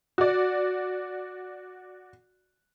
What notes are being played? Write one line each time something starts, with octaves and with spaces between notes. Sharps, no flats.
F#4 D5